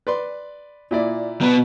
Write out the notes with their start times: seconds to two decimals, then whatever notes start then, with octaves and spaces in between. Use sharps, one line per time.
0.07 B4 D5 C6
0.91 A#2 E4 D5
1.41 B2 B3